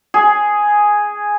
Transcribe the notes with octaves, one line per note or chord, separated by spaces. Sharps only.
G#4